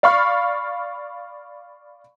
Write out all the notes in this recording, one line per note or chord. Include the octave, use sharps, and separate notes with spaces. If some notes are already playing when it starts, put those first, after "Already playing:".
D5 F5 B5 C#6 F6